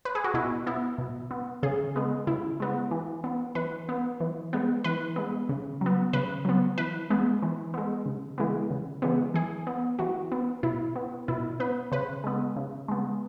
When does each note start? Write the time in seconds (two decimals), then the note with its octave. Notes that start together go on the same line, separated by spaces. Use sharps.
0.05 B4
0.15 G#4
0.24 F#4
0.34 B2 E4
0.66 B3 E4
0.98 B2
1.31 B3
1.63 C#3 G#4
1.96 G#3 B3
2.27 C#3 E4
2.60 G#3 B3
2.91 E3
3.24 B3
3.55 E3 B4
3.89 B3
4.20 E3
4.53 G#3 B3
4.84 E3 B4
5.16 G#3 B3
5.49 C#3
5.81 F#3 B3
6.13 C#3 B4
6.45 F#3 B3
6.78 E3 B4
7.10 G#3 B3
7.42 E3
7.74 G#3 B3
8.06 C#3
8.38 E3 G#3 B3
8.71 C#3
9.02 E3 G#3 B3
9.34 E3 G#4
9.67 B3
9.99 E3 F#4
10.32 B3
10.63 B2 E4
10.96 B3
11.28 B2 E4
11.60 B3 B4
11.92 C#3 B4
12.24 G#3 B3
12.56 C#3
12.88 G#3 B3